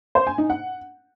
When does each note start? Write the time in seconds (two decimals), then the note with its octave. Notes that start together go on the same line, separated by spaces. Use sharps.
0.15 C5
0.27 G#5
0.38 D#4
0.50 F#5